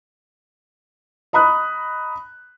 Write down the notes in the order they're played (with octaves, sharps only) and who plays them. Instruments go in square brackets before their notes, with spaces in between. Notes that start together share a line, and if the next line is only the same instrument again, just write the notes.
[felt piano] D#5 A#5 B5 D#6 F#6